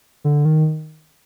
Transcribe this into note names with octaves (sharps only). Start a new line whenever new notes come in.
D3
D#3